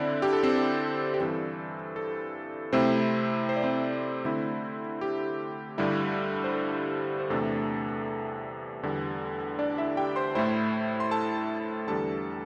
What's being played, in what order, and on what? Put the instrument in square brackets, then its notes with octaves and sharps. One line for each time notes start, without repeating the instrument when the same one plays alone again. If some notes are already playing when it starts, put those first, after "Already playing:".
Already playing: [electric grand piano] D3 C4 D4 E4 D5
G4
A4
C4 C5
G4
G2 E3 C4 A4
A4
C3 A3 C4 E4 C5
C5
D5
C4 C5
D3 A3 C4 E4
G4
G2 D3 G3 E4
C5
A4
C5
E2 C3 A3 D4 A4
E2 D3 G3
D4 D5
E4 E5
G4 G5
C5 C6
A2 A3 E4 C5 C6
C6
A4 A5
E2 D3 G3 D4 A4 A5